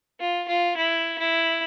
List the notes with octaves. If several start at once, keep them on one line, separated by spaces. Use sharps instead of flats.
F4
F4
E4
E4